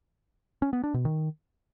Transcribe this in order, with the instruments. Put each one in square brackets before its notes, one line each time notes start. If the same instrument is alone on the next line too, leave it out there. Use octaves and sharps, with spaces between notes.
[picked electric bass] C#4
B3
D4
B2
D#3